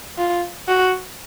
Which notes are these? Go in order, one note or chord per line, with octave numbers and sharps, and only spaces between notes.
F4
F#4